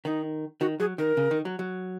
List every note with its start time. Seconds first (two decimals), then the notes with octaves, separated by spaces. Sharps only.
0.05 D#3 D#4
0.60 D#3 F#4
0.80 F#3 G#4
0.98 D#3 A#4
1.17 C#3
1.31 D#3
1.45 F#3
1.59 F#3